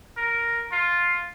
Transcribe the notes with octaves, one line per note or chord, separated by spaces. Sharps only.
A#4
F4